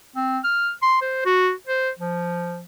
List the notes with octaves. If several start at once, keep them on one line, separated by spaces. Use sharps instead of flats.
C4
F6
C6
C5
F#4
C5
F3